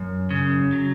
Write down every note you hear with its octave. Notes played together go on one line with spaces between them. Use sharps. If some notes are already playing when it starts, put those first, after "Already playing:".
Already playing: F#2
C#3
F#3